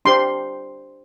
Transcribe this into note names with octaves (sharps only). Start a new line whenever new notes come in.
D4 G4 C5 C6